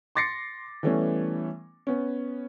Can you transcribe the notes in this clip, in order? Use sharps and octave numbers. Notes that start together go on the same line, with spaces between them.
C6 D6 A6 A#6 C7 C#7
E3 G3 A3 B3 C#4
B3 C#4